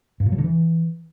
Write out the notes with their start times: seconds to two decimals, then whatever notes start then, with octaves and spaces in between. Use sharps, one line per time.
0.20 G2
0.26 A#2
0.32 F#3
0.38 D3
0.44 E3